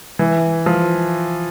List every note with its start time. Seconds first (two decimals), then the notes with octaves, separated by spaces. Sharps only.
0.19 E3
0.66 F3